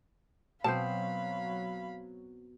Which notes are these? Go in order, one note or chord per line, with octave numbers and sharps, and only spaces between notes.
B2 F#3 C4 C5 F5 A5 B5